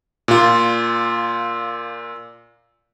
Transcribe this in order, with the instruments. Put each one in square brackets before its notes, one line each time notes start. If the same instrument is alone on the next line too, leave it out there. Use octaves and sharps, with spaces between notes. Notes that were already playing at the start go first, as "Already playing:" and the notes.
[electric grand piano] A#2 F4